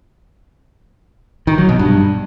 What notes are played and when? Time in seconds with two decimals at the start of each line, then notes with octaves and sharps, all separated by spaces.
1.47 D#3
1.58 F#3
1.69 B2
1.79 G2